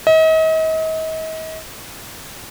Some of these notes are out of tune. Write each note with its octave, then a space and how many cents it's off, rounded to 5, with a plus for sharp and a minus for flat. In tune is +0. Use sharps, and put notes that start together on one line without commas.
D#5 +40